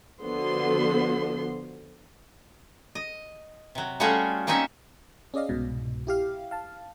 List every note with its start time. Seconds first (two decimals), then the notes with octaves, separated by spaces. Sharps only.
0.22 D3 F3 B3 F#4 C6
2.95 D#5
3.75 C3 F#3
4.00 G3 A3 C#4 F4 F#4 G#4
4.47 A#3 C4 C#4 D#4 E5
5.34 C#4 G#4 D5 D#5 F5
5.49 C2 G#2 B2
6.07 E4 G4 F5
6.51 F5 A5